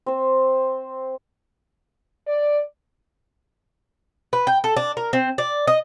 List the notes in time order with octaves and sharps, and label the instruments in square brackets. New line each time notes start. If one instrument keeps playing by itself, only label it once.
[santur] C4 C5
[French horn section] D5
[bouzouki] B4
G5
A4
D4
A#4
C4
D5
D#5